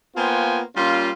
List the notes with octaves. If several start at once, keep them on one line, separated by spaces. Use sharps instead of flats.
A#3 B3 F4 C5 G5 G#5
G3 A#3 C#4 F4